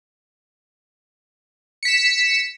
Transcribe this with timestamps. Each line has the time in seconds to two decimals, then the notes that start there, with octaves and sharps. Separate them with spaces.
1.83 C#7
1.85 B6
1.88 E7